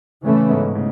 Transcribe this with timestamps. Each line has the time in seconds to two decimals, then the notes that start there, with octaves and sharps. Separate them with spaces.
0.25 A2 C#3 E3 A3 C#4
0.50 G#2 B2
0.75 A2 C#3